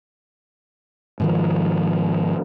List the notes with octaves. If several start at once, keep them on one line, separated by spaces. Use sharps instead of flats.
G#2 D#3 F3